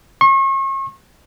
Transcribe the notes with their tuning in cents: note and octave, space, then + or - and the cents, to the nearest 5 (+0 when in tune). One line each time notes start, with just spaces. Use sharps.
C#6 -40